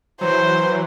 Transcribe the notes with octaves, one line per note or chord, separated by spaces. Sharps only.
E3 F#3 C5